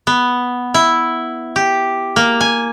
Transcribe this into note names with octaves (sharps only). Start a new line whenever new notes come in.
B3
E4
G4
A#3
G#5